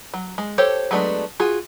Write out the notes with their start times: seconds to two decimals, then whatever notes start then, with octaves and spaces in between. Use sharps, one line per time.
0.14 F#3
0.38 G#3
0.58 G4 A4 C5 C#5
0.91 F#3 G#3 A3 B3 D4
1.40 F4 F#4 G#4